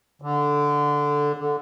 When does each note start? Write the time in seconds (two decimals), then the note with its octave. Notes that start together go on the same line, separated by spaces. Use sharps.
0.22 D3
1.36 D3